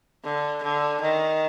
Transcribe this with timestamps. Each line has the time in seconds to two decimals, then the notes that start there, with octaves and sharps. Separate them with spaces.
0.25 D3
0.63 D3
1.01 D#3